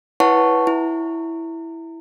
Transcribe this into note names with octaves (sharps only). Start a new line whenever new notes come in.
E4 B4 C#5 F#5 A5 C#6
E4